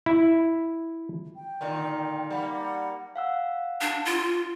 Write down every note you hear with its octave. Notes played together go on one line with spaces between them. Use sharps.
E4
G5
A#2 D3 D#3
G3 A#3 F#5
F5 F#5 E6
D4
F4